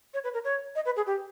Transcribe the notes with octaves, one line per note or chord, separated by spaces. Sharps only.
C#5
B4
A#4
C#5
D#5
B4
G#4
G4